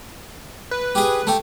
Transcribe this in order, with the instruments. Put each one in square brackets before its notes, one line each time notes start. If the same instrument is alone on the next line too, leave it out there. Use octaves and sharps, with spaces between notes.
[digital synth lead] B4
[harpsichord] G4 G#4
A3 G4